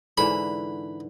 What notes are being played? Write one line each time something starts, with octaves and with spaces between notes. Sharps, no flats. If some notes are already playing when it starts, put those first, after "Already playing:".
G#2 D3 E3 B5